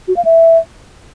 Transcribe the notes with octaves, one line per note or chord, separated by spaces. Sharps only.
F#4
F5
E5